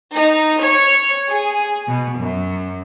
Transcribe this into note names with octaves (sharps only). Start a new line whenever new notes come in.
D#4
C#5
G#4
B2
F#2